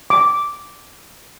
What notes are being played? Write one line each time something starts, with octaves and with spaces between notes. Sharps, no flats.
D6